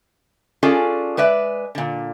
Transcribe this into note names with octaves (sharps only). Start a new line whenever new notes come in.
C#4 D4 F4 G#4 A4 D5
G#3 B4 D5 E5
A#2 D3